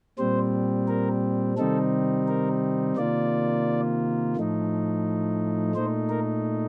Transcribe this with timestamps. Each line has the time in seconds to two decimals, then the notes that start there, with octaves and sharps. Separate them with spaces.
0.19 A#2 G3 C4 C5
0.88 A#4
1.57 C3 D#3 G3 C4 D#4 A4
2.28 A#4
2.97 C3 D#3 A#3 F4 D5
4.36 A2 F3 A3 D#4
5.75 A#2 A3 D#4 C5
6.09 A#4